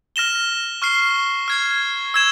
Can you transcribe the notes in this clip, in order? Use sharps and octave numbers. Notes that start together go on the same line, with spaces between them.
F6 A#6 E7 G7
C#6 F6 C7 G7
F6 G#6 C7
E6 G#6 E7